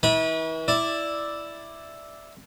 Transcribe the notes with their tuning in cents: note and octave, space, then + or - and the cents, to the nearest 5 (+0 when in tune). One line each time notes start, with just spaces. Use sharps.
E3 -40 G#5 -25 B5 -35
E4 +0 D5 +0